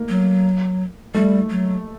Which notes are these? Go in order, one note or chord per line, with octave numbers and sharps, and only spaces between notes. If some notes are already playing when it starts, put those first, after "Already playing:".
Already playing: A3 A#3
F#3
G3 A3
F#3